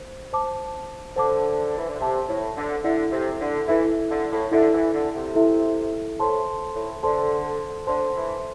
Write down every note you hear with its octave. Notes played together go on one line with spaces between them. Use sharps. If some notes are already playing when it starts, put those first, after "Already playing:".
Already playing: C5
C5 A5 D6
D3 C5 A5 D6
E3
D3
C3 C5 A5 D6
A2
D3
D3 E4 A4 E5
C3
D3
E3 E4 A4 E5
D3
A2
D3 E4 A4 E5
E3
D3
C3
E4 A4 E5
A2 A4 C5 A5 C6
A2
D3 A4 C5 A5 C6
D3 A4 C5 A5 C6
E3